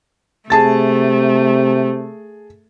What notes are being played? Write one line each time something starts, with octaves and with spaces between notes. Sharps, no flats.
C3 A3 G#4 A5 A6